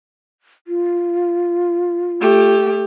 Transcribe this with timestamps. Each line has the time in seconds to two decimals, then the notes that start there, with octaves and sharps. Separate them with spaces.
0.67 F4
2.21 A3 G4